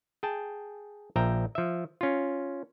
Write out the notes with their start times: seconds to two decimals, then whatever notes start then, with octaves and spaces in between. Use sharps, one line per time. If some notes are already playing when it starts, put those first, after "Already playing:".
0.23 G#4 G5 A5
1.16 A#1 F3 E5 G5 A#5
1.55 F3 E5
2.01 C#4 F4